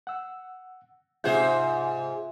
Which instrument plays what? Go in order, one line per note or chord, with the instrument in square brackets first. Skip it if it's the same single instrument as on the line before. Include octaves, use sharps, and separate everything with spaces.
[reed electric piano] F#5 E6
[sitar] G#2 G#4 C5 [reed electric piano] C3 F#5 G6 [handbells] F4 E5